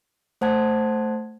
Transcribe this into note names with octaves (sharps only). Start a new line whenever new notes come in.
A3 C5 F#5 A5 F#6 G#6